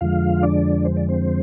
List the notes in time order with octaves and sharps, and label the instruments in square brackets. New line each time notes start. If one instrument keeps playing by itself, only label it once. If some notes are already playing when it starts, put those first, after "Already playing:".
[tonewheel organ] F2 D3 F3 G#3 F4 F5
D4 D5
C5
D5
C4 C5